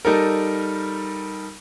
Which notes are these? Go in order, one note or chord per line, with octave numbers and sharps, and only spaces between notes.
G3 D#4 A4 A#4